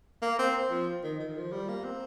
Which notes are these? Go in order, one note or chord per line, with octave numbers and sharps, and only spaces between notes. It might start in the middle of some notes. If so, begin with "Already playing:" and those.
A#3
C4
F3
D#3
D#3
F3
G3
A#3
C4